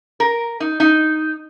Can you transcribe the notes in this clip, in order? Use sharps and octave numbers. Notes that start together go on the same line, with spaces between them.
A#4
D#4
D#4